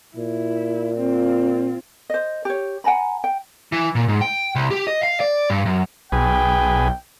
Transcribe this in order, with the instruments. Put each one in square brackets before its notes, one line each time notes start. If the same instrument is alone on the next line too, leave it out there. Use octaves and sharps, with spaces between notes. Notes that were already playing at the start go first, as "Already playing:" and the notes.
[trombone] A#2 [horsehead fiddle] E4
[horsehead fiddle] C4 F4
[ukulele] C5 D#5
G4 C#5
F#5 G#5 A#5 B5
G5
[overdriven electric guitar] E3
A#2
G#2
G5
C2
G4
D#5
F5
D5
G2
F#2
[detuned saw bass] B1 [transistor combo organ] G#4 B4 [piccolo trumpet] G5